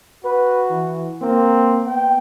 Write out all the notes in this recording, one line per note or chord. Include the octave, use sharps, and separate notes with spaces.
F#4 B4
E3
A#3 C4
B3 G5